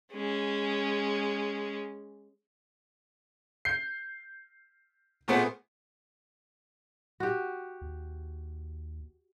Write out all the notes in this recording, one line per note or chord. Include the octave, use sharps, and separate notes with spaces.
G#3 C#4
G6 C7
A#2 A3 B3 C4 G#4
F#4 G4
D#2